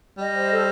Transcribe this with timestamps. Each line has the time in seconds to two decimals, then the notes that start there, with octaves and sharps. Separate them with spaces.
0.18 G3 D#5
0.33 C5
0.50 A4